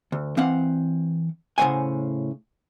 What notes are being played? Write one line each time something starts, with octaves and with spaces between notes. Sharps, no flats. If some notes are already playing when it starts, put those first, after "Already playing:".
D2
E3 C4 F5 F#5
A2 C#3 A3 C5 F#5 G#5